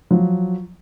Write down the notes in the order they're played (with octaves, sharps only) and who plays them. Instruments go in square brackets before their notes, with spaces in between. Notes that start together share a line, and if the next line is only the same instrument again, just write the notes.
[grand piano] F3 F#3